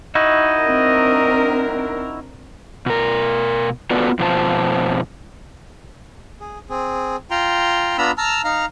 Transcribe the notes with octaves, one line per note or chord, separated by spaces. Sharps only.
D#4 E4 F#4 D#5
C4 D4 A#4
B2 A#4
B3 F4 F#4 A4 B4 D5
F2 B2 F4 C5 A5
G#4
C4 G#4
F4 G5 A#5 C6
B3 D4 F4 A#5 B5 E6
A5 A#5 E6 F6
D#4 F5 A#5 F6